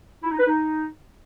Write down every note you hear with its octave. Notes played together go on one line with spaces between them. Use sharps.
E4
D#4
B4
D#4